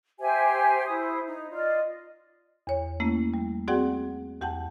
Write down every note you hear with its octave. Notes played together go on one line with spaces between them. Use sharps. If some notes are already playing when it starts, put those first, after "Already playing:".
G4 C5 E5 G#5
E4 C5 D#6
D#4
F4 D5 D#5
E2 C#5
A3 A#3 C#4 E4
G3
C4 F#4 G#4 D5 F#5 G5
E2 G4 F#5 G5 A5